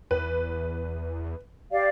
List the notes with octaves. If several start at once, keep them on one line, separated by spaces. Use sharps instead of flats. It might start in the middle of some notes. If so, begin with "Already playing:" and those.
E2 B4
G4 D5 F5